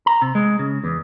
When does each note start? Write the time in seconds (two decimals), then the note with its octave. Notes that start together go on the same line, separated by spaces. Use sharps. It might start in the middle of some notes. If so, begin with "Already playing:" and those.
0.06 A#5
0.22 C3
0.35 G#3
0.59 C#3
0.84 E2